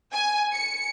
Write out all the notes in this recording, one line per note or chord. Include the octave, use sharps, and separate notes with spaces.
G#5
C#7